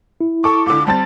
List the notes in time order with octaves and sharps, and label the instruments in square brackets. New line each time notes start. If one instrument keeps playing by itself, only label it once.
[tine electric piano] E4
[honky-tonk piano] A4 D6 [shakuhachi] C#6
[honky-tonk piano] C#2 D3 [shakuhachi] D6
[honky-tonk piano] G3 C4 A6 [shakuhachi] A5